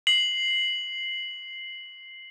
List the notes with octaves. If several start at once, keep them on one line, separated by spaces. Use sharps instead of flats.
C7 F#7